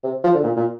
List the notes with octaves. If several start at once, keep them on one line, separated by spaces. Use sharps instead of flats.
C3
F3
D3
A#2
A#2